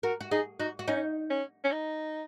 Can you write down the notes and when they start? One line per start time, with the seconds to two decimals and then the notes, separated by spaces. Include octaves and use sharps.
0.03 F#4 A#4
0.21 F#4
0.31 D#4 G#4
0.60 D#4 F#4
0.79 F#4
0.88 C#4 D#4
1.30 C#4
1.64 C#4
1.72 D#4